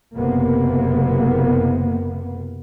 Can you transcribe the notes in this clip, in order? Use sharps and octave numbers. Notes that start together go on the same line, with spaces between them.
F#1 C3 A#3 B3